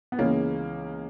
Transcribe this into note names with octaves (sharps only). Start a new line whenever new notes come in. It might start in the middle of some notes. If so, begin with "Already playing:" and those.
B3
C#2 C#3 E3 A#3 C#4